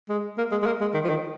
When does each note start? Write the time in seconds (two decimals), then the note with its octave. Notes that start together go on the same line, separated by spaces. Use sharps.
0.09 G#3
0.38 A#3
0.52 G#3
0.62 G#3
0.66 A#3
0.81 G#3
0.94 D#3
1.04 F3
1.09 D#3